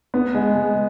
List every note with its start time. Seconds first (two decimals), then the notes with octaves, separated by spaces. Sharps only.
0.14 B3
0.35 G#3
0.56 G#3